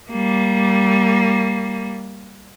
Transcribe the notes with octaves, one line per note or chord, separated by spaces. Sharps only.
G3 A#3